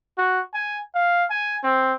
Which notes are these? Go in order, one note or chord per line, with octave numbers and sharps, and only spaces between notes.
F#4
G#5
F5
G#5
C4